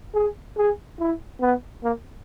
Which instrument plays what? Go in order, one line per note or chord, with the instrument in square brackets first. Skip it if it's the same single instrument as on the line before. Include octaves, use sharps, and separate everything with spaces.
[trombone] G#4
G#4
E4
B3
A#3